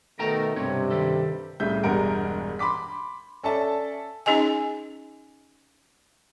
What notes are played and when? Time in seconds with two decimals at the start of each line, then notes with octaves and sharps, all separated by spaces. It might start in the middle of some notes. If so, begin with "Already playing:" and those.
0.19 B2 D#3 A3 A#4 G5 A#5
0.56 B1 G2 C3 C4 C#5
0.90 D#3 G3 A4
1.60 C2 A2 C#3 E5 G6
1.84 E1 G2 G#3 A#4 F#5 D7
2.59 B5 C6 D6 B6
3.43 C#4 A4 D5 E5 A5
4.26 C#4 D#4 G#4 D#5 G#5